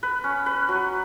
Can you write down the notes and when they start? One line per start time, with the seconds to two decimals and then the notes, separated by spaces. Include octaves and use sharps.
0.03 B4
0.24 C#4
0.46 B4
0.69 F#3